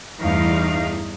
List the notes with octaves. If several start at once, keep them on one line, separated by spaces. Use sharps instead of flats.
E2 G2 A3 D#4 F5